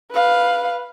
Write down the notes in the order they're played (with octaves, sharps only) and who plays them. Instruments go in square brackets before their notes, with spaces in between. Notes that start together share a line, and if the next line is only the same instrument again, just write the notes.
[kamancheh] B4 F5